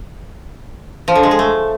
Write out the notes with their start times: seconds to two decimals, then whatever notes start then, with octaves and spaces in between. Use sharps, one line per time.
1.08 F3
1.15 D3
1.23 G#3
1.31 G#4
1.39 A3